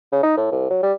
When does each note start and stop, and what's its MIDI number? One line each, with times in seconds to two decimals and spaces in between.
0.12 0.20 49
0.23 0.37 63
0.37 0.51 45
0.51 0.68 36
0.70 0.80 54
0.83 0.93 55